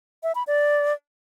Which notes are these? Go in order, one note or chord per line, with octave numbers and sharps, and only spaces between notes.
E5
B5
D5